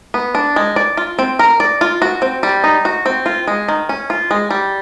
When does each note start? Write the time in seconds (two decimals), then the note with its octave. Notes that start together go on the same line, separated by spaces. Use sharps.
0.14 B3
0.35 D4
0.56 G#3
0.76 D5
0.97 F4
1.19 C4
1.39 A#4
1.60 D5
1.81 F4
2.02 F#4
2.22 C4
2.43 G3
2.64 D#4
2.85 F#4
3.06 C4
3.26 F4
3.47 G#3
3.68 D#3
3.89 C#4
4.10 F4
4.31 G#3
4.51 G3